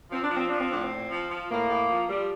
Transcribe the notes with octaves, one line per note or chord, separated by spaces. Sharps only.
F3 C4
D4
F3 C4
F3 D4
C4
A2 D4
C4
A#2
F3
F3
A2 A#3
A2
F3
F3 G3